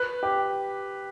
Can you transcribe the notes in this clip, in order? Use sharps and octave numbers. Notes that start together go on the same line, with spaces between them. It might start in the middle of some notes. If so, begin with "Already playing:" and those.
Already playing: B4
G4